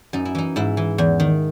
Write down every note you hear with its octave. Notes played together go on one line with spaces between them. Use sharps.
F#2 D#4
E4
E3 D#4
G#2 E4
E3
E2
D#3